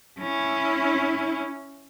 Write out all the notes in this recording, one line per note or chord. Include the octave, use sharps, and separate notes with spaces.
C#4 E4